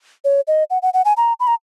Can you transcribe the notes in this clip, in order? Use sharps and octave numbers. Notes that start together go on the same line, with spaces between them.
C#5
D#5
F#5
F#5
F#5
G#5
A#5
B5
A#5